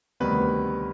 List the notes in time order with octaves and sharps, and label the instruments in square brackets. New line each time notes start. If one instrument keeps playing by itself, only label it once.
[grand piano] D2 C3 D#3 G3 B3 B4